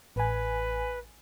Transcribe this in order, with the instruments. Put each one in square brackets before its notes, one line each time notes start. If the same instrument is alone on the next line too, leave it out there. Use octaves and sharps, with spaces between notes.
[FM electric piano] A1 G#5 [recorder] B4